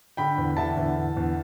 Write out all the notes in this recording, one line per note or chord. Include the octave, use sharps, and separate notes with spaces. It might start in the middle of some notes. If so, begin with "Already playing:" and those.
D3 G5 B5
E2
D3 E5 A5
E2
D3
E2